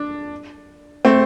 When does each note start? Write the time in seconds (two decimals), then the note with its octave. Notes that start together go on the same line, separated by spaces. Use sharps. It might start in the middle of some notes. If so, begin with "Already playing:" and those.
Already playing: D4
1.05 A3 C4